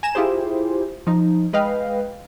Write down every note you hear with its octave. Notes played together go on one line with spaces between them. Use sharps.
G#5 A#5 E7
E4 F4 G4 G#4 C5
F3 D#4
G#3 B4 D#5 F5 G5